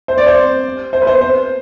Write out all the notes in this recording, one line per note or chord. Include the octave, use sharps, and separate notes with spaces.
C5
D5
C5
C5
B4
C5
C5